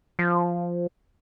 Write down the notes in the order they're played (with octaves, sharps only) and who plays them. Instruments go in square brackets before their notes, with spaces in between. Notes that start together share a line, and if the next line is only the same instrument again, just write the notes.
[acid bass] F3